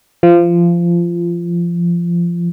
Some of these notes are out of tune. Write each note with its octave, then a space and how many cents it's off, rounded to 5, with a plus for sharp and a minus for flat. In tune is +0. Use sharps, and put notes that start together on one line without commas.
F3 -20